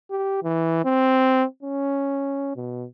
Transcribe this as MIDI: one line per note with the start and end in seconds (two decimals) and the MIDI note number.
0.11 0.40 67
0.43 0.82 52
0.85 1.44 60
1.63 2.54 61
2.56 2.85 47